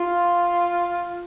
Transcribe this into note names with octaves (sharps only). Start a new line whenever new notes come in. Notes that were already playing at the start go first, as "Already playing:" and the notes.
Already playing: F4